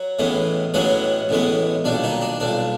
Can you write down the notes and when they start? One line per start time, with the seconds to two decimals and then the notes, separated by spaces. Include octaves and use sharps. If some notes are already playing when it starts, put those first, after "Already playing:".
Already playing: F#3 F#4
0.19 A1 A2 E3 G#3 B3
0.74 A1 A2 E3 F#3 G#3 B3 F#4
1.29 A1 A2 E3 G#3 B3
1.84 B1 A#2 G3 D4
2.03 D#3 D#4
2.21 D4
2.40 B1 A#2 G3 D4